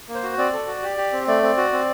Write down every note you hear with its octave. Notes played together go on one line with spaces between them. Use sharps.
A#3
C5
F#4
C4 D5
A4
F#4
G4
G4
C4
A3 D5
C4
F#4
C4